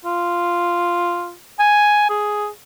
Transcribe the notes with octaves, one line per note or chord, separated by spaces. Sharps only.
F4
G#5
G#4